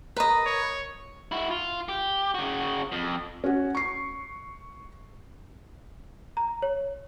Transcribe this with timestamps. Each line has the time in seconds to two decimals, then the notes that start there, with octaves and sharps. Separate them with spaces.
0.16 A#4 B4 D#5
0.46 C#5
1.32 E4 F#4
1.50 F4
1.89 G4
2.34 C#3 F#4
2.92 F2
3.44 C#4 F#4
3.75 C#6 C7
6.37 A#5
6.62 C#5